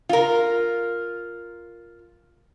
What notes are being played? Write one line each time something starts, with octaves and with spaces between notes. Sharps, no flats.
F4 A#4